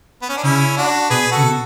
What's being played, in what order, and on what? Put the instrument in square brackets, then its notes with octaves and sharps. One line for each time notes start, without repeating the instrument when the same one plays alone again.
[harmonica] B3
C#4
D4
[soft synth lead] C#3 [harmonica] C#4 E4
[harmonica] D4 F#4
[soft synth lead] B2 [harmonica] G#4 B4
[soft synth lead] C#3 [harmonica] F#4 A4
[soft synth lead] B2